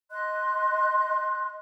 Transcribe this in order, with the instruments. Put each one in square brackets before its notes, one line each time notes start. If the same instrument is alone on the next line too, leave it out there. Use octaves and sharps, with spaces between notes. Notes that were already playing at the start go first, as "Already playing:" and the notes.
[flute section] D#5 C6 F#6